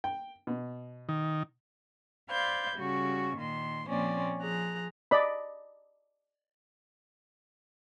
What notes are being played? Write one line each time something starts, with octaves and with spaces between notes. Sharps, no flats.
G5
B2
D#3
C5 D5 F5 B5 G6 G#6
C#3 G3 F#4 C#6
A#2 D#3 A#3 C6
A#2 F3 A#3 C4 C#4 D5
F3 G#4 A#5 F#6
D5 D#5 B5